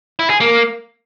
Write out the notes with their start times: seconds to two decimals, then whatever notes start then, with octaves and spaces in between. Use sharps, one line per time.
0.19 E4
0.30 G#4
0.40 A#3